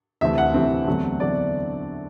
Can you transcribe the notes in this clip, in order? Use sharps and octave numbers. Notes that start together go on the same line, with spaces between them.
D2 C3 E3 A3 C4 E5
F#5
D2 C3 E3 A3 C4
E2 D3 F#3 A3 C4
E2 D3 F#3 A3 C4 D5